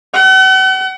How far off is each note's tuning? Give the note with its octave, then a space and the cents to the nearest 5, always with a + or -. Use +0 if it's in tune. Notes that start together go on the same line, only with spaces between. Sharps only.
F#5 +40